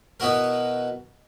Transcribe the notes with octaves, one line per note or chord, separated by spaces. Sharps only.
B2 B3 E4 F#4 A#4